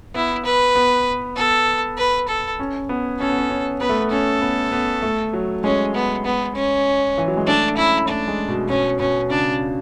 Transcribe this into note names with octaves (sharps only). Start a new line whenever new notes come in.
B3 E4
B4
B3
B3 A4
B4
A4
C#4
B3
C#4 A4
B3
C#4
C#4
B3 B4
A3
B3
C#4 A4
B3
B3
A3
F#3
G#3 C#4
B3
B3
C#4
E3
F#3
G#3
A3 D4
C#4 E4
A3 D4
G#3
B2
B2 C#4
B2 C#4
C#3 D4